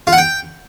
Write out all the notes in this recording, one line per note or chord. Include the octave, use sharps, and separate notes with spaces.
F4
F#5
G5